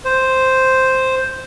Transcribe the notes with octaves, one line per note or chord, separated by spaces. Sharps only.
C5